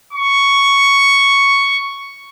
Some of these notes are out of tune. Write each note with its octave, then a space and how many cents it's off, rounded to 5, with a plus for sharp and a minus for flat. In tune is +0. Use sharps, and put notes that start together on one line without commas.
C#6 +5